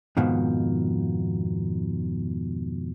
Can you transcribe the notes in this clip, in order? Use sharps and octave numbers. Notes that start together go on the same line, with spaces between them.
F2 G#2 B2 D#3 F3